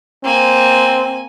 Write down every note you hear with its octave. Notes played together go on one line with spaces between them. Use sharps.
A#3 C4 G#5